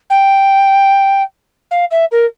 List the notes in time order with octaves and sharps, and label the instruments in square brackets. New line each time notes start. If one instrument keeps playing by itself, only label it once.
[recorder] G5
F5
E5
A#4